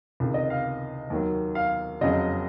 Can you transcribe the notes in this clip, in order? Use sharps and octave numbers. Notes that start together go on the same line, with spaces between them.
C#2 C3 D#3
D#5
F5
D#2 D#3 F#3
F5
F#1 F2 C#3 F#3 D#5